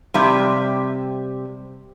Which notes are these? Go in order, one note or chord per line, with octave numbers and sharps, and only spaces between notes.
C3 G3 G4 E5